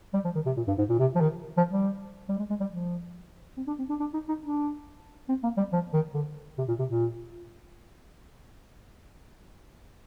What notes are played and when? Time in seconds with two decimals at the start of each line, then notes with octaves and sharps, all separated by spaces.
0.14 G3
0.25 F3
0.35 D#3
0.46 C3
0.57 A#2
0.67 G2
0.78 G#2
0.89 A#2
0.99 C3
1.15 F3
1.21 D#3
1.57 F3
1.71 G3
2.29 G3
2.39 G#3
2.50 G#3
2.60 G3
2.71 F3
3.57 C4
3.67 D4
3.79 C4
3.89 D4
4.00 D4
4.14 D#4
4.28 D#4
4.43 D4
5.29 C4
5.43 A#3
5.57 G3
5.72 F3
5.93 D#3
6.14 D3
6.58 C3
6.68 A#2
6.79 C3
6.89 A#2